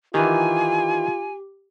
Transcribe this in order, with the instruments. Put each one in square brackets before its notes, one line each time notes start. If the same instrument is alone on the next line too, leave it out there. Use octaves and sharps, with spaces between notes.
[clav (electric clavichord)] D#3 E3 [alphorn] F4 [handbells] G4 [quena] G#5